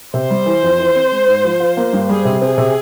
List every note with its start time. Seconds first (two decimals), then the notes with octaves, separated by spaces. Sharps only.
0.14 C3 C5
0.30 G3
0.46 E3
0.63 F2
0.79 E3
0.95 C4
1.12 G#3
1.28 G#2
1.45 F3
1.60 F4
1.77 A#3
1.93 G2
2.09 G3 G#4
2.25 C3
2.42 C4 G#4
2.58 C3